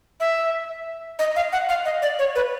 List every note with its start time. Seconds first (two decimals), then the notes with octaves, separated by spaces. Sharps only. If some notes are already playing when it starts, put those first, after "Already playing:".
0.20 E5
1.19 D#5
1.36 F5
1.53 F#5
1.69 F5
1.85 D#5
2.02 D5
2.19 C#5
2.35 B4